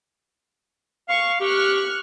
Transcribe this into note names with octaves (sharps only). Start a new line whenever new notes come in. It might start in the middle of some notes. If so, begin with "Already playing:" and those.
F5 C#6
G4 C#6 F6 F#6